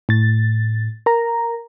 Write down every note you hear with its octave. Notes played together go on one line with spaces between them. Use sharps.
A2 A6
A#4 A#5